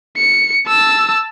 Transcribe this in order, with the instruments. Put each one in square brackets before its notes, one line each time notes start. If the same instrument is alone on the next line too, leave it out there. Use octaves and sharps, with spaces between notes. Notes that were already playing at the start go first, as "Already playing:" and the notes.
[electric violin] C#7
A5 E6